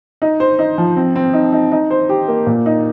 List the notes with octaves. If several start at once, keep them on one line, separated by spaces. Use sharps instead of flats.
D#4
C5
D#4
F3
C4
C4
D#4
D#4
D#4
C5
G4
A#3
A#2
D#4